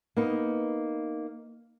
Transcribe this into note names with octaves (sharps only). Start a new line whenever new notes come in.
A#3 B3 D#4